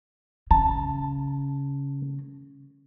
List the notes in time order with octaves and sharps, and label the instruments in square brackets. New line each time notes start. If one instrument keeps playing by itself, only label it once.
[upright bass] C#3 [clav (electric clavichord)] A5